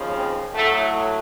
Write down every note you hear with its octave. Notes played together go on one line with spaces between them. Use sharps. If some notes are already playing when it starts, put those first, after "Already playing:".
Already playing: D#2 C#3 F3
C4
A2 F#3 A3